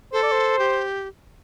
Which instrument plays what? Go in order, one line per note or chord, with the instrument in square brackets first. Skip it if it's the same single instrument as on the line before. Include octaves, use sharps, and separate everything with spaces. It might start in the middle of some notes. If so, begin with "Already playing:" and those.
[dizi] A4 [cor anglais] C5
[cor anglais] D5
C5
[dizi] G4